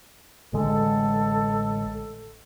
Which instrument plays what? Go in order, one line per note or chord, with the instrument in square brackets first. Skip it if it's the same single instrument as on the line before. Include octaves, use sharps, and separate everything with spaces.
[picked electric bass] A1 D3 G#3 [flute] A4